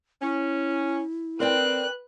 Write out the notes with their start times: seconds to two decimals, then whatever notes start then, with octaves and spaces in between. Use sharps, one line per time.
0.22 C#4 E4
1.40 C4 A#4 B4 D5 G5 F#6